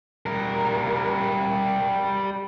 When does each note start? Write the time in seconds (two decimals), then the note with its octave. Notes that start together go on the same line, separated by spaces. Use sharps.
0.26 G3 A#4